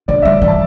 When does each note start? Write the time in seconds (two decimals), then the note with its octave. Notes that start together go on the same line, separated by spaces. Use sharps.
0.08 D3 D5
0.22 G3 E5
0.31 D5
0.42 E3
0.48 A5